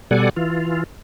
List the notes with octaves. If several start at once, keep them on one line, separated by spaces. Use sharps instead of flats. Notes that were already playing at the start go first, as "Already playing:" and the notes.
B2 G3 A4 D5 F#5 G#5
E3 F4